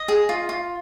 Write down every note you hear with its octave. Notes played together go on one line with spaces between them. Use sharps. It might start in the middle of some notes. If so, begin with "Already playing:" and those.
Already playing: D#5
G#4
F4
F4